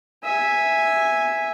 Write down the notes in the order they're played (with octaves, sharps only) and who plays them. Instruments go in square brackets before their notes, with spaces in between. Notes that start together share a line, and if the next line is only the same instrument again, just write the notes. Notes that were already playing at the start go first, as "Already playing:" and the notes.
[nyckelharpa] E5 G#5